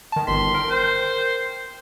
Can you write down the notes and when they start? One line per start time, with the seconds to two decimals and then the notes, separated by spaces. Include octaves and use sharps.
0.12 D#3 A5
0.27 G1 D#3 C6 B6
0.54 A#4 G5
0.70 C5